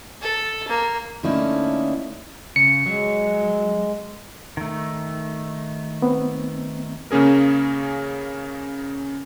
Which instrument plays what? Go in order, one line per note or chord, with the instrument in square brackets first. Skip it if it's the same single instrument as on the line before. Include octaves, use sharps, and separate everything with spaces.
[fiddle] A4
A#3
[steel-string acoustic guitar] D3 A3 A#3 C#4 D#4 E4
[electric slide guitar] C#3 [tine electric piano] C#7
[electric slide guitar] F#3 [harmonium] G#3
[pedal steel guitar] D#3 A3
[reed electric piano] B3 C4
[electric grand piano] C#3 A#3 C#4 G#4 A#4